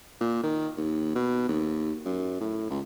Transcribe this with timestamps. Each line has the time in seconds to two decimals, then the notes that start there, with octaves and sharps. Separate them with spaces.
0.20 A#2
0.43 D#3
0.77 D#2
1.15 B2
1.49 D#2
2.05 F#2
2.40 A2
2.70 C#2